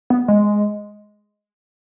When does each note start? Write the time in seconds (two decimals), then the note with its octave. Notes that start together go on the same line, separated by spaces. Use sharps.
0.10 B3
0.28 G#3